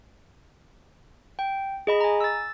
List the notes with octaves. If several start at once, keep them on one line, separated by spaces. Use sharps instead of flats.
G5
G#4 D#5 B5
G#5 A#5
E6 A6